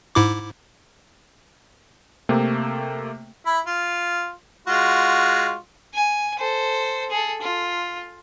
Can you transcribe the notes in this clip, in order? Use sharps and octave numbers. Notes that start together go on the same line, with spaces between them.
G#2 E4 D6
C3 A3 A#3 C4
E4 B5
F4
G#3 F4 F#4
G#5
A4 C5
G#4 A4
F4